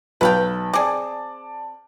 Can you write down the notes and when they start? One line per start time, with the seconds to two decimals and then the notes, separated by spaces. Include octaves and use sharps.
0.21 B1 B4 F5 G5 A5 F#7
0.73 C4 G#4 D5 A5 D6